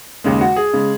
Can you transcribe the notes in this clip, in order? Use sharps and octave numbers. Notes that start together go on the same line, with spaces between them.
D#2 C#3 G#3
F#4
G#4
C#3 G#3